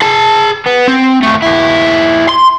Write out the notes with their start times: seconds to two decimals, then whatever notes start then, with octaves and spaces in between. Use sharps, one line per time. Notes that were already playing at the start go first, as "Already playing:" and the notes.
0.02 G#4 A5
0.66 B3
0.88 C4
1.23 D#2 A3
1.42 D#2 E4
2.29 C6